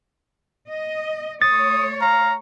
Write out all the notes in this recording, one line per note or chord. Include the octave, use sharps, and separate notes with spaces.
D#5
A3 C#5 D#6 A6
F5 A#5